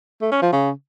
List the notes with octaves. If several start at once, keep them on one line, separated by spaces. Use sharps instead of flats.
A3
C#4
F3
C#3